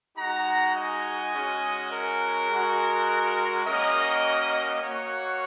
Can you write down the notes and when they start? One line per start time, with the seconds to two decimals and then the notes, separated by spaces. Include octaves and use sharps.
0.17 G#3 D#4 F#4 F#5 A#5
0.75 D#5 G#5
1.33 G#3 C#4 F#4
1.92 A#4
2.50 G#3 F#4
3.66 A#3 C#4 F#4 A#4 D#5
4.82 A#3 F#4 C#5 F#5